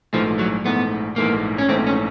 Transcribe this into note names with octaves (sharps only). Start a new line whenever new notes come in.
A#1 G#2 E3 F3 A3
F#3
A#1 G#2 E3 A3 B3
A#1 G#2 E3 A3 A#3
C#4
A#1 G#2 E3 A3 C4
C#4